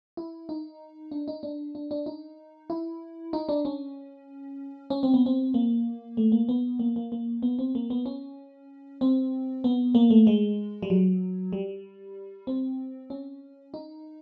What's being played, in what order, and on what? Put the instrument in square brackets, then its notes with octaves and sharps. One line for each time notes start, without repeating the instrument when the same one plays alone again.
[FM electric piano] E4
D#4
D4
D#4
D4
D4
D4
D#4
E4
D#4
D4
C#4
C#4
C4
B3
C4
A#3
A3
A#3
B3
A#3
A#3
A#3
B3
C4
A#3
B3
C#4
C4
B3
A#3
A3
G#3
G3
F#3
G3
C4
C#4
D#4